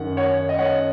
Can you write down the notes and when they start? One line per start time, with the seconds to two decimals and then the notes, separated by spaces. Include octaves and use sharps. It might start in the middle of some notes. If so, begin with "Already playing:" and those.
Already playing: F#2 D#3 F#5
0.17 C#5 F#5
0.49 D#5
0.58 C#5 F#5